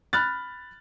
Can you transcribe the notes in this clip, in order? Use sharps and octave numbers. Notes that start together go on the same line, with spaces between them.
B5 F6 F#6 A6